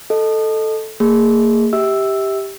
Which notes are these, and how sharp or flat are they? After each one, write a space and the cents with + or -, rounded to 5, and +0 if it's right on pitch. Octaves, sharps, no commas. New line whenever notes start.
A4 +0 D#5 +0
A#3 -35 G#4 -10
G4 +0 E5 -30 E6 +0